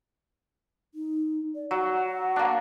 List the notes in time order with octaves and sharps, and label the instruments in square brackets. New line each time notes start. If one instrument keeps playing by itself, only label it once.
[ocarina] D#4
D5
[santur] F#3 [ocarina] F#5
[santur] A#3 D4